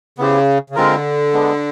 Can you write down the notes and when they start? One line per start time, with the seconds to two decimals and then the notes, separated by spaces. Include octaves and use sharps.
0.18 C#3 B3 E4 G4 C5
0.70 C#3
0.75 D3 G#3 C4 F4 A#4
1.33 G#3 B3 D4